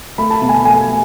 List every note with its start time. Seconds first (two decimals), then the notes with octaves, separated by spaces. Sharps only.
0.18 A3 B5
0.30 A5
0.41 B2 B5
0.49 G#5
0.54 A5
0.65 A3 G#5